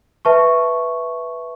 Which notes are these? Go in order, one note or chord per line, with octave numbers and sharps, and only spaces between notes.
B4 E5 A5 C#6